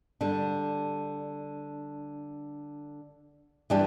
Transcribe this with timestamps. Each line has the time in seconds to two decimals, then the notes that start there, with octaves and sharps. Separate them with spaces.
0.21 D3 G3 D4
3.70 E3 G3 D4 G4